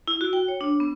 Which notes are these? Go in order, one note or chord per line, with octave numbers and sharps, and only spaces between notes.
E4
F#4
G5
C#5
D4
B3